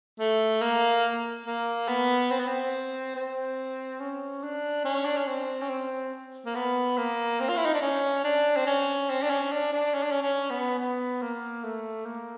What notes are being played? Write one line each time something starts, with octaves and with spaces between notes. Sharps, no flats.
A3
A#3
A#3
B3
C4
B3
C4
C4
C#4
D4
C#4
D4
C#4
C4
C#4
C4
A#3
B3
A#3
C4
F4
E4
D#4
D4
C#4
D4
C4
C#4
C4
D4
C#4
D4
D4
C#4
D4
C#4
C#4
B3
B3
A#3
A3
A#3